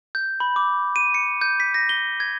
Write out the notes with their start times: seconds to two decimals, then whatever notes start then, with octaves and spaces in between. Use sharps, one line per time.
0.15 G6
0.40 B5
0.56 D6
0.96 D#7
1.14 C#7
1.42 G6
1.60 B6
1.74 A#6
1.89 G7
2.20 G#6